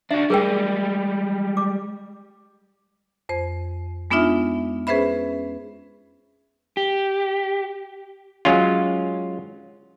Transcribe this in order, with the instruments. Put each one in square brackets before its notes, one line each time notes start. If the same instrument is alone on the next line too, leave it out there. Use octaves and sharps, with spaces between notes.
[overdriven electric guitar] D4 F#4 [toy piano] E5
[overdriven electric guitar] G3 G#3 [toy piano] G#4 A#4 G5
[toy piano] D6
[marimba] F2 C5
G#3 B3 D4 D#4 F4 E5
C#4 G#4 B4 C5 E5 B5
[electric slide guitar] G4
[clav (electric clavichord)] F#3 G#3 C#4 F4